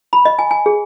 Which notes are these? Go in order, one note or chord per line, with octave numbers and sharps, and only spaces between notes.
B5
D#5
G#5
G#5
G#4